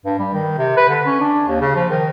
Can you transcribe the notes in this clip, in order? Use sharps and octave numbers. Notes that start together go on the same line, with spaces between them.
G2
G3
D#3
C3
B4
D3
C#4
D4
D#2
C#3
F3
D#3